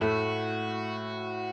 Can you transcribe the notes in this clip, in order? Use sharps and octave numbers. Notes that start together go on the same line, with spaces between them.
A2 A3 F#4